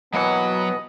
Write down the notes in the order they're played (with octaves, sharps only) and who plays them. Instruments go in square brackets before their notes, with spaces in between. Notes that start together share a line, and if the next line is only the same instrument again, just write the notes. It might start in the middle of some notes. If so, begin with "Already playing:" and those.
[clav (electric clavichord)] D#2 B2 E3 [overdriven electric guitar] F#3 F#5 [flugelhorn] B3 [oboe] D#5